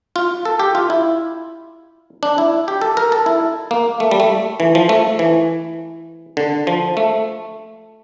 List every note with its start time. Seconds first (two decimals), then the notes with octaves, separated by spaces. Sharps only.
0.16 F4
0.45 A4
0.59 G4
0.75 F4
0.90 E4
2.23 D4
2.38 E4
2.68 G4
2.81 A4
2.97 A#4
3.12 A4
3.26 E4
3.71 A#3
4.00 A3
4.11 G3
4.20 A3
4.60 E3
4.75 F3
4.89 A3
5.19 E3
6.37 D3
6.67 F3
6.97 A3